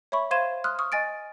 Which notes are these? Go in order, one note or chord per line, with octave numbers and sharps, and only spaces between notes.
C#5 E5 B5 C#6
C5 F5 C6 G#6 D#7 E7
C6 D#6 F6 F#6
C#6 D#6 F6
D#5 G#5 A6 D7